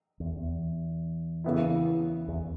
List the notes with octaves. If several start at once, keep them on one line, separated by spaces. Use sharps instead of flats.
E2
E2
C#3 E3 B3 E4
E2